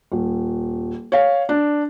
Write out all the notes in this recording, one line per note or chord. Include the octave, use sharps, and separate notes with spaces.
D#1
C#5 F5
D4